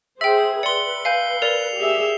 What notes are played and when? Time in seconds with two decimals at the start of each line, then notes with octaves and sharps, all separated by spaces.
0.21 G#4 C5 E5 G5 E6
0.63 B4 D5 C6 C#7 G7
1.05 F5 G#5 G6 C7
1.42 A#4 D5 F7
1.76 G4 G#4 E5